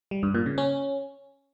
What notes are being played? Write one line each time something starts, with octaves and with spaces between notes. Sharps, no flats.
G3
G2
A#2
C#3
C#4